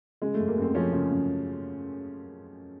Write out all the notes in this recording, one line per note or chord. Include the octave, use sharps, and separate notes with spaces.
C#3 G#3
F#2 A3
A#3
F#2 C4
F3 C#4
C#3
F#2